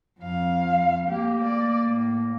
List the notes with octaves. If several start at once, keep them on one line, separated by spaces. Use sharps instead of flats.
F2 F5
A3 A#3 G4
D5
A2